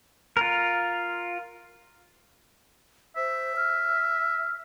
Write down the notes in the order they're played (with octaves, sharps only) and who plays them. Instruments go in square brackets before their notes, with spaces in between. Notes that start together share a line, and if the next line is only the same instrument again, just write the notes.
[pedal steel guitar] F4 A#4
[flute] C5 [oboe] E5
[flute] F6